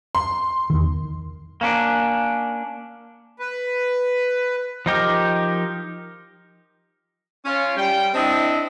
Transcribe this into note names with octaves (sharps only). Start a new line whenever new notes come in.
C6
E2 D#3
A#3 C#4 D4
B4
F3 D#4 G4 A#4
C#4 F4
G3 G5
C4 D4 E4 D#5